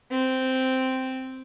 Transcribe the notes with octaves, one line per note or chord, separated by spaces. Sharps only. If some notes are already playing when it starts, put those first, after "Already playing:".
C4